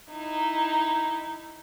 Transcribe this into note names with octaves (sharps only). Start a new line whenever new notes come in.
D#4 E4